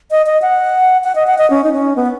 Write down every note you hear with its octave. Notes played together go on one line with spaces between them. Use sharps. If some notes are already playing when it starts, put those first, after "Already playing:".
D#5
D#5
F#5
F#5
D#5
F#5
D#5
C#4
D#4
C#4
B3